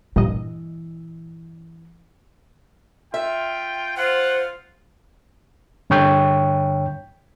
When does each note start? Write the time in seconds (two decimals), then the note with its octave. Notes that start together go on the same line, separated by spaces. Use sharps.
0.16 G2 A#2 E3 D#5
3.14 F4 E5 G5
3.97 F4 C5 F#5
5.90 G2 D3 C#5 G5 C#6 G6